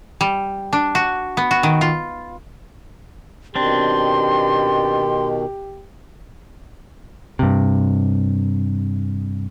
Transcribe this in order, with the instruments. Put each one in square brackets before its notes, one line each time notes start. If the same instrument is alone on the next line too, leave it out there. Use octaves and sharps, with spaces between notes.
[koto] G3
D4
F#4
B3
F#4
D#3
F4
[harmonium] B2 D#3 [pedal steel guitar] C4 D4 [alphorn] G4 [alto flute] C6
[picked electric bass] G2 C3